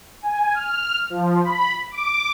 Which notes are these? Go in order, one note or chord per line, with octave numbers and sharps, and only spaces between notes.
G#5
F6
F3
B5
D6